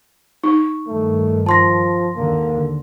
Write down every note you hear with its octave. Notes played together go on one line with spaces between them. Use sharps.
D#4 C#6
G2 D#3 A3
F3 A5 C6 A#6
D#2 G#2 D3 A#3